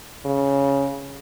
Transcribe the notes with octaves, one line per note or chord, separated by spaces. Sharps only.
C#3